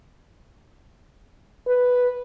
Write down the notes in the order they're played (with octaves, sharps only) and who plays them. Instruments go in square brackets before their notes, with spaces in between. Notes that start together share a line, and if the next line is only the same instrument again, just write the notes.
[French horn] B4